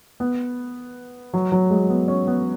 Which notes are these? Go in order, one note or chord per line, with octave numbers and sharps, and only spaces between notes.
B3
F#3
F#3
G#3
B3
C#4
B3